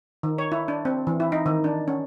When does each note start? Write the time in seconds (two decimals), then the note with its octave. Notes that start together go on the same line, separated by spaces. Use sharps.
0.23 D#3
0.38 C#5
0.52 E4
0.68 D4
0.85 C4
1.07 E3
1.20 E4
1.32 D#4
1.46 D#3
1.64 D4
1.88 C#4